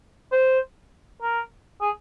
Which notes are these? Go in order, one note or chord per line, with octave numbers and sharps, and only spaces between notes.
C5
A#4
G#4